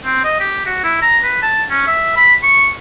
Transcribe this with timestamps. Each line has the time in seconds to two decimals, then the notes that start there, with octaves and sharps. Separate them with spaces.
0.05 C4
0.24 D#5
0.40 G4
0.66 F#4
0.84 E4
1.02 A#5
1.24 B4
1.43 A5
1.70 C#4
1.87 E5
2.16 B5
2.43 C#6